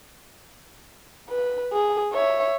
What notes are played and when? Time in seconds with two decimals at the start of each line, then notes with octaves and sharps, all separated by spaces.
1.29 B4
1.73 G#4
2.13 C#5 E5